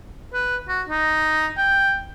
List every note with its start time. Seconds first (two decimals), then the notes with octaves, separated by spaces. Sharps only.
0.33 B4
0.68 F#4
0.89 D#4
1.58 G5